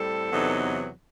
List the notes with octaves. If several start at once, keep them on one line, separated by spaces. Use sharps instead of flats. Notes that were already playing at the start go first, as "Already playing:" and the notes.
Already playing: A2 G3 C4 A4
E2 C3 F#3 B3 D#4